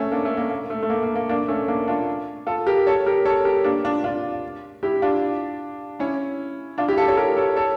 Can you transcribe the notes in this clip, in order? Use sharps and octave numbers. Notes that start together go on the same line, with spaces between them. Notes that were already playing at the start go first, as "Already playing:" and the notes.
Already playing: A3 C#4
A#3 D4
A3 C#4
A#3
A#3
A3
A3
A#3
A#3
A#3
A#3 D4
A3 C#4
A#3 D4
D4 F4
F4 A4
G4 A#4
A4 C#5
G4 A#4
A4 C#5
G4 A#4
A#3 D4
D4 F4
D4 F4
E4 G4
D4 F4
C#4 E4
D4 F4
E4 G4
F4 A4
A4 C#5
G4 A#4
A4 C#5
A4 C#5